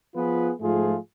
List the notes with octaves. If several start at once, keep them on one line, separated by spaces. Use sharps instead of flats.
F3 B3 F4 G#4 B4
G#2 F3 A3 F4 G#4